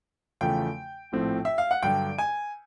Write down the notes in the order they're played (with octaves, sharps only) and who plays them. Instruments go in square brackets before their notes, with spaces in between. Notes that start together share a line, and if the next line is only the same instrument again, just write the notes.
[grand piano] E2 C#3 F3 A3 [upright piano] G5
[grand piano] A#1 A2 F3 A3 C4
[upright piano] E5
F5
F#5
[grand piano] G2 D3 F#3 [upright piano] G5
[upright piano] G#5